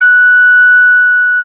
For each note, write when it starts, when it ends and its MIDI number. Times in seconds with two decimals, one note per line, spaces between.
0.01 1.39 90